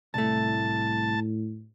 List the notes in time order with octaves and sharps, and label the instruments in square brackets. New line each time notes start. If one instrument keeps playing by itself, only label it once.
[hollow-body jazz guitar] C2 A3 [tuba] A2 [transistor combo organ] A5